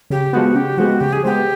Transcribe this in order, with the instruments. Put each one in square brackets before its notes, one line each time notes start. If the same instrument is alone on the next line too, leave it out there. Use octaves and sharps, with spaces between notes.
[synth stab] C#3 [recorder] G4
[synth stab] F3 G#3 B3 [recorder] F#4
[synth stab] C#3 [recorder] G4
[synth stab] F3 G#3 B3 [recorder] F#4
[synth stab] C#3 [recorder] G4
[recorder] G#4
[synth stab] F3 G#3 B3 [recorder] G4